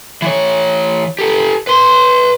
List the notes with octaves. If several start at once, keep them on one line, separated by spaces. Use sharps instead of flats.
E3 C#5
G4 A4
B4 C6